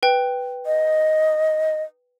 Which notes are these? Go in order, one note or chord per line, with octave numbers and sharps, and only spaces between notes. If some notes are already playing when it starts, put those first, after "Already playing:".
B4 G5
D#5